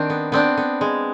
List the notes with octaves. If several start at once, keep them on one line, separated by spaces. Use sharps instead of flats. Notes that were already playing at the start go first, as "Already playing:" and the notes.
Already playing: D#3 C4 D4
B3
B3 C4 D4
B3
G#3